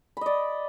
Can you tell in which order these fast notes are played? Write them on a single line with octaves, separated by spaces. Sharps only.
B5 D#5 D5